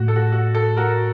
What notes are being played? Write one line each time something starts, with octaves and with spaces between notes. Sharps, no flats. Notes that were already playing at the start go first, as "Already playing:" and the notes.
Already playing: A2 F#4
A4
F#4
F#4
A4
F#4 A#4